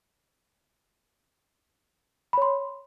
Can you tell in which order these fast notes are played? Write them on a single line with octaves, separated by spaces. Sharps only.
B5 C#5 C6